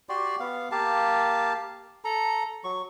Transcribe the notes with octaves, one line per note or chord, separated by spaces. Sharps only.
F#4 G4 D5 C6
B3 F5
A#3 G4 F5 A5
A4 A#5
F#3 C#6